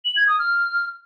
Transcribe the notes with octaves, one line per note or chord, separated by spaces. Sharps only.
F#7
G#6
D#6
F6